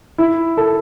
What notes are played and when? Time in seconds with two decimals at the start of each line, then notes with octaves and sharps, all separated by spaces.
0.18 E4
0.57 A4